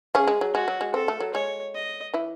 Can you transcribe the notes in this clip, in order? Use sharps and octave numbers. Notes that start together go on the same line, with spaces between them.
C#3 C#4 G#4
G#3
F#3
G#3 F#4
F#3
G#3
C4 A4
A3
F#3
G#3 C#5
D#5
E3 E4